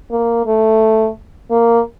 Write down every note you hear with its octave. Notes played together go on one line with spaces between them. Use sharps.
A#3
A3
A#3